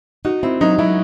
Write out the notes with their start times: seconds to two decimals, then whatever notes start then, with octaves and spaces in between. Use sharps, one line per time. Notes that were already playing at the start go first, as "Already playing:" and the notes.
0.25 D#4 F#4
0.43 C4 E4
0.61 F#3 D#4
0.79 F#3 E4